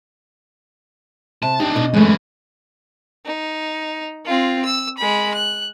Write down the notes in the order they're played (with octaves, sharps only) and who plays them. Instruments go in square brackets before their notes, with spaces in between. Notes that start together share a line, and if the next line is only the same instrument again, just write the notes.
[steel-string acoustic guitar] C3 [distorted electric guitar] A5
[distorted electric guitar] D4 D#4 [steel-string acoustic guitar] G4
[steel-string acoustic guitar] B2 D#5
[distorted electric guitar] F#2 E3 [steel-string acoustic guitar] G#3 A3
[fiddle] D#4
C4 F4
E6
G#3 B5
F#6